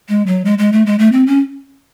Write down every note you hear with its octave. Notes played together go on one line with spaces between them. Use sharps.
G#3
F#3
G#3
G#3
A3
G#3
A3
C4
C#4